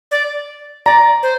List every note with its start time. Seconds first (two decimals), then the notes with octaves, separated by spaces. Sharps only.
0.11 D5
0.86 D5 A#5
1.23 C5